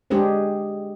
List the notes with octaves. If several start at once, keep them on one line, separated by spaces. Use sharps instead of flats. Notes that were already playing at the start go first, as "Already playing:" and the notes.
G#3 D4 G4 G#4 C5